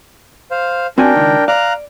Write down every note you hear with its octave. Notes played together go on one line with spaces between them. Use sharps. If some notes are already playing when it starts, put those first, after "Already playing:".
C5 F5
C4 D4 F#4 A#4 G5 G#5
C#2 D#3
D5 F5 A#5 F#6